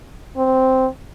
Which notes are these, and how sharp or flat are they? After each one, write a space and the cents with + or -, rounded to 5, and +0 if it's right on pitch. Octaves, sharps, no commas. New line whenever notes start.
C4 -5